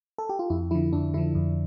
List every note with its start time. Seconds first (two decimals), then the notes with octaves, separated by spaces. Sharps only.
0.18 A4
0.29 G4
0.39 F4
0.50 F2 E4
0.71 D3 F3 E4
0.93 F2 D4
1.14 D3 F3 E4
1.35 F2